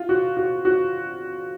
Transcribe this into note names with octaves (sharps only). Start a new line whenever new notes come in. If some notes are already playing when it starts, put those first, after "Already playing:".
Already playing: F4
F#4
F#4
F#4